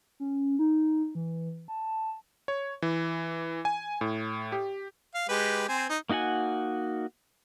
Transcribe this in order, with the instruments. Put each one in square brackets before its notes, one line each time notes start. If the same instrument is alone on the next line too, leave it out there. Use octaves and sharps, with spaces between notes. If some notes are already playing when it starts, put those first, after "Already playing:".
[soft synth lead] C#4
D#4
E3
A5
[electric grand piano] C#5
E3
G#5
A2
G4
[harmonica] F5
G#3 G4 B4
C4 C5 G#5
D#4
[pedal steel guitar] A#3 D#4 F#4 F#5 G#5